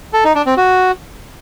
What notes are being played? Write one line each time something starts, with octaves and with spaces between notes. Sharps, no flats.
A4
D#4
D4
C4
F#4